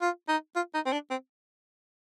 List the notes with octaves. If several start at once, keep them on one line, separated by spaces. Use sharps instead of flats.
F4
D#4
F4
D#4
C4
D4
C4